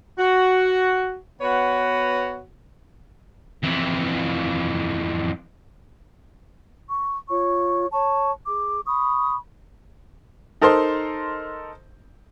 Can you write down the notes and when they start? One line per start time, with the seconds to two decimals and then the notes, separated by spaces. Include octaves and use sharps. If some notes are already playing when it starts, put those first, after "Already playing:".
0.18 F#4
1.41 B3 F#4 B4 C#5
3.64 F2 E3
6.89 C#6
7.29 F4 C#5 C#6
7.92 C#5 A5 C#6
8.46 G#4 D6
8.86 B5 C#6 D#6
10.61 D#4 A4 A#4 C5 D#5 C6